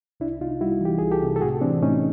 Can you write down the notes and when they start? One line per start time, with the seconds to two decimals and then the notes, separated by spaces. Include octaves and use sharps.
0.20 C2 D4 E4
0.40 C3 D#4 F4
0.61 G3 E4 F#4
0.81 E3 G4
0.98 C2 G#4
1.11 G4 A4
1.22 C3
1.36 A4
1.41 A2 F#4 G#4
1.61 E3 C4 D4
1.82 A2 C#4 D#4